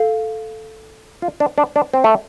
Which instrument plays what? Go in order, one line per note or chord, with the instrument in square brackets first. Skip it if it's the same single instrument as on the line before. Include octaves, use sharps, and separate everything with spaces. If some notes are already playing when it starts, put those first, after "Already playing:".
Already playing: [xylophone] A4 F5
[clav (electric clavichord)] F4
D4
D4
D4
C4
A3